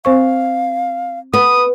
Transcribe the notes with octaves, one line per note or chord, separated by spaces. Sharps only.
C4 C5 F5 C#6
B3 D#6